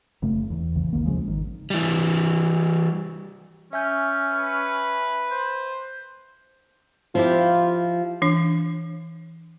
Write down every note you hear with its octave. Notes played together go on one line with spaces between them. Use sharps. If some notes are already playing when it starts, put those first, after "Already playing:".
F1 C#3 A3
E2
A#1 D#2 C#3 E3
A#1 E2 D#3 A#3
D1 C#3 F3 G#3
G#1 D#3
E3 G3
C#4 E5 G#5 G6
B4
C5
F3 E4 F4 G4
E3 D4